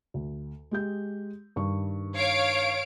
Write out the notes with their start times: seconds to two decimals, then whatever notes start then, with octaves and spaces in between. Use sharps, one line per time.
0.14 D2
0.71 G#3 G4 G6
1.56 G2 D#3 C#6
2.15 C#5 F5 D7